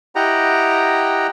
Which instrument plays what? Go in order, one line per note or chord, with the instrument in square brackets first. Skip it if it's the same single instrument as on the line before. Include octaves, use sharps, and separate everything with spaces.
[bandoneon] E4 G4 D#5 F#5 G5 A#5